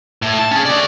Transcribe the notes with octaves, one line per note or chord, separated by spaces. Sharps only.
A2
A5
C#4 G#4
F#4 D5